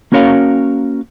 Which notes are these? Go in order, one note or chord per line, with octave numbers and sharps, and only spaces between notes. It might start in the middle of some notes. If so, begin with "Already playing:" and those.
A#3 C#4 F#4 A#4 C#5 F5